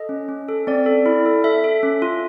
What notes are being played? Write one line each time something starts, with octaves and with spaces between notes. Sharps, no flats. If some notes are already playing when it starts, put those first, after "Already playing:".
Already playing: A4 D#5
C#4
C#4
A4
C4 D5
A4
E4
A4
A4 E5
A4
C#4
F4